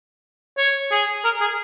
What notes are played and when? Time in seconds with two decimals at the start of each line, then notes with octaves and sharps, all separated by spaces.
0.58 C#5
0.92 G#4
1.25 A#4
1.41 G#4